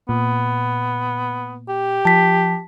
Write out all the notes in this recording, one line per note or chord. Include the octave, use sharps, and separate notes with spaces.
A#2 B3
G4
F3 A5 B6